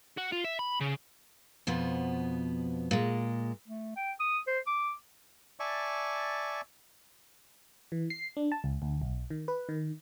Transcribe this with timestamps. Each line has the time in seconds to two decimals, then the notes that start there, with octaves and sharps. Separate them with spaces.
0.17 F#4
0.32 F4
0.44 E5
0.59 B5
0.80 C#3
1.67 F2 B2 F3 B3
2.91 A#2 G#3
3.68 A3
3.96 G5
4.20 D#6
4.47 C5
4.67 D6
5.60 D5 E5 G#5 A5 C#6
7.92 E3
8.10 C7
8.37 D4
8.52 A5
8.64 C#2
8.82 D2
9.02 B1
9.30 D#3
9.48 B4
9.69 D#3